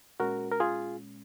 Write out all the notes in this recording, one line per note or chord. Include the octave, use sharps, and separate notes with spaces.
A#2 G#3 C#4 F#4 A#4
A#4
F4 G#4